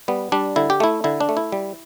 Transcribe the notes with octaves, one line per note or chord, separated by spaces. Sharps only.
G3 B3
G3 D4
D3 E4
G4
A3 E4
D3 E4
D4
A3
E4
G3